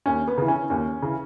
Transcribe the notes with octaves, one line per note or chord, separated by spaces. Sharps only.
D#2 C#4
B3
C#3 E3
C#4
D#2 C#4
C#3 E3